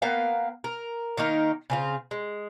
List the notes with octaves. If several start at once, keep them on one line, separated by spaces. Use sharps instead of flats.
A#3 B3 F5 G5
A#4
D#3 A#3 D#4 A#4
C#3 C4 F4
G#3